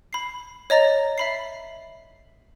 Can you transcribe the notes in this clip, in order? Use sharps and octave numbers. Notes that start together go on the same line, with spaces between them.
B5 C7
C#5 D#5 A#5 A6 A#6
E5 B5 C7